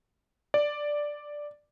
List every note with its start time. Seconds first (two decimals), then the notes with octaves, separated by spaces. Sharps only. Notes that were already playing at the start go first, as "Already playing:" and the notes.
0.54 D5